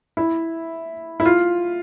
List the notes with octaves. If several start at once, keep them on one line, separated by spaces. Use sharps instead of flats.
E4
E4
F4